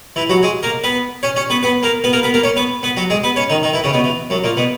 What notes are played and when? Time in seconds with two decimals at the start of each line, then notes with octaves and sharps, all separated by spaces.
0.16 E3 E4
0.29 F#3 F#4
0.43 G#3 G#4
0.63 A#3 A#4
0.84 B3 B4
1.23 C#4 C#5
1.36 C#4 C#5
1.50 B3 B4
1.63 B3 B4
1.83 A#3 A#4
2.04 B3 B4
2.13 A#3 A#4
2.23 B3 B4
2.34 A#3 A#4
2.43 C#4 C#5
2.56 B3 B4
2.83 B3 B4
2.97 F#3 F#4
3.10 G#3 G#4
3.23 B3 B4
3.36 C#4 C#5
3.50 D#3 D#4
3.63 D#3 D#4
3.73 E3 E4
3.84 C#3 C#4
3.93 B2 B3
4.04 E3
4.30 F#2 F#3
4.44 A#2 A#3
4.57 B2 B3